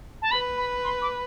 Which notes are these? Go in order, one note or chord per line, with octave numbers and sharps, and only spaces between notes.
A5
B4 B5
B5
C6
D6